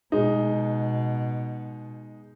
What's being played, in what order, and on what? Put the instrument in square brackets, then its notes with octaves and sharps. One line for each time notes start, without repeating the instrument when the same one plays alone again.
[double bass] B2 [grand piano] G#3 D#4